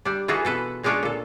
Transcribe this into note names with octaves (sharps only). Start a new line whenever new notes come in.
G3 D4
E3 F4 F#4 G#4 A4 B4
B2 A4 B4
B2 G#3 C#4 D4 F4 C#5
A#2 A4